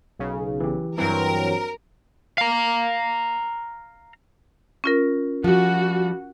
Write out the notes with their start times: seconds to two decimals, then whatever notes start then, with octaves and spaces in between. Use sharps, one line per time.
0.19 B1 C#3
0.60 E3 G4
0.98 G2 E3 F#3 C4 A#4
2.38 F5 A#5
4.84 C#4 F4 A#4
5.44 F3 G3 F#4